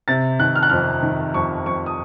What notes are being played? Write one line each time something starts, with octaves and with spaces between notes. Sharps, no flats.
C3 A6
D#3 F#6
F6
F#6
F2 F6
D#3
F2 C#6
F2 C#6
D#6